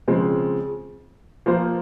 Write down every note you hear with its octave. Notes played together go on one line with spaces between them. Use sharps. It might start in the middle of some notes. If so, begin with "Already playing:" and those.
C#3 F3 G#3 C4
F3 A#3 F4 C5